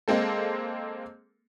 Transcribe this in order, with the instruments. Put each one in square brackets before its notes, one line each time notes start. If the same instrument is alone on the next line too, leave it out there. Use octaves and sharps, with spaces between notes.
[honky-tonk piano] G#3 A#3 C4 A4